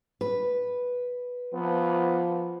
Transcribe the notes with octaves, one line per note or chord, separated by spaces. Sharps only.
B4
F3 B3